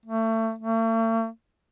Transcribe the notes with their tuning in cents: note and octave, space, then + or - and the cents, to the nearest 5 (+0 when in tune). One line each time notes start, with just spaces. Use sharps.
A3 +30
A3 +45